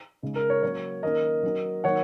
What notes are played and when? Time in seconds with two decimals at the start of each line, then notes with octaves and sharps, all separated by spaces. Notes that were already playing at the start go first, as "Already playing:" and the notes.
0.23 C#3 G#3 D#4
0.36 A#4
0.50 C#5
0.63 F#3 A#3 C#4 C#5
1.03 D#3 A#3 C#4 A#4 D#5
1.43 F#3 C#4
1.84 D#3 F#3 A#3 C#5 F#5